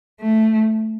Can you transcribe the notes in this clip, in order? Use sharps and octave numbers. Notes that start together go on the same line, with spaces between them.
A3